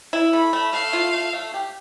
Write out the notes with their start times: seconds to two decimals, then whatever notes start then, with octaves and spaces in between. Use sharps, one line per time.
0.13 E4
0.33 A3 B5
0.53 A3
0.73 A3 F5
0.93 F4
1.14 A3
1.33 A3
1.54 G4